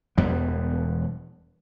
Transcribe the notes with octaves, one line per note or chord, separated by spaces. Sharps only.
E1 E2 G3 B3